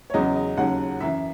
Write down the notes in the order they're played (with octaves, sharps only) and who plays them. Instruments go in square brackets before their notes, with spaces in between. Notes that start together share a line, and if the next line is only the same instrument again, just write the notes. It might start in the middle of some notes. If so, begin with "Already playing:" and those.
[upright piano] C#5
E2 C#3 F#3 D#5
D#5
D#2 C#3 F#3 F#5
F#2 E3 E5